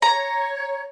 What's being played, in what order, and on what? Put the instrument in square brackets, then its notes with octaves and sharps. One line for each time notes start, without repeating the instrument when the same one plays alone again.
[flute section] C#5 [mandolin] A#5